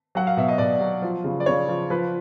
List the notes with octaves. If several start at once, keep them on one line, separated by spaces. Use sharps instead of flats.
F#3 F#5
F5
B2 E5
D#5
B2 D5
F#3
F3
C#3
D5
C#3 C#5
F3
F3 B4